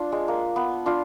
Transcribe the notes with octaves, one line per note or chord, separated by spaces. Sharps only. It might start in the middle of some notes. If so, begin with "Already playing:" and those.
Already playing: D4 F4
G#3
A#3
B3
D4 F4